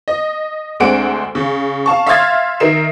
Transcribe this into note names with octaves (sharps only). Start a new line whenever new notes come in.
D#5
D2 G#3 C4 D4 F#5 D7
C#3
F5 A5 C#6
E5 F5 C6 F6 G#6 A6
D#3 A#4 E5 C7 E7